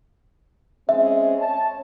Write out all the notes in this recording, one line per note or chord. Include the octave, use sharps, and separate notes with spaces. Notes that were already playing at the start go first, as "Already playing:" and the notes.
G#3 C4 C#4 E5
C#5 A5